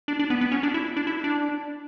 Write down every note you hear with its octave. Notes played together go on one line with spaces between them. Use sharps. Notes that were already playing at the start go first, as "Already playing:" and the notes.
D4
D4
B3
B3
C#4
D4
E4
D4
E4
D4